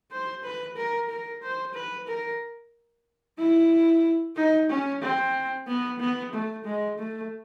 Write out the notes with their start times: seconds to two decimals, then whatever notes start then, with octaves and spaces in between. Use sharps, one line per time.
0.12 C5
0.43 B4
0.76 A#4
1.09 A#4
1.42 C5
1.74 B4
2.07 A#4
3.38 E4
4.36 D#4
4.69 C#4
5.02 C4
5.67 B3
6.00 B3
6.33 A3
6.65 G#3
6.98 A3